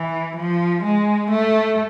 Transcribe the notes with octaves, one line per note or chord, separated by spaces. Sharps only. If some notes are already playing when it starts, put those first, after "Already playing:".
Already playing: E3
F3
G#3
A3